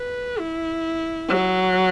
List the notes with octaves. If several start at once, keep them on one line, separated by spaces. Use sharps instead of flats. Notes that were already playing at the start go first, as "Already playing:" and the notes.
Already playing: B4
E4
F#3